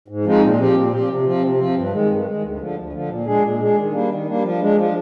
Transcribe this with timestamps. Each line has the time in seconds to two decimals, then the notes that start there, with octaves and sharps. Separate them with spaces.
0.08 G#2
0.25 F3 G#3 C4 D#4
0.42 A#2
0.59 F3 C4 G4
0.76 A#2
0.92 F3 C4 G4
1.08 C3
1.25 F3 C4
1.43 C3
1.58 F3 C4
1.76 G2
1.92 D#3 G#3
2.09 G2
2.26 D#3 G#3
2.42 D2
2.59 D3 F3
2.76 D2
2.93 D3 F3
3.09 A#2
3.26 G#3 D4 G#4
3.43 A#2
3.60 G#3 D4 G#4
3.76 D#3
3.92 G3 A#3 D4
4.09 D#3
4.27 G3 A#3 D4
4.43 F3
4.60 G#3 D4
4.77 F3